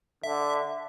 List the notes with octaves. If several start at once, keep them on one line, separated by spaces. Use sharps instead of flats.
D3 E5